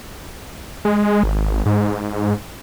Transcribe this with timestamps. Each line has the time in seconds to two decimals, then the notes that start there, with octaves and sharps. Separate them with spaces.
0.85 G#3
1.23 G#1
1.66 G#2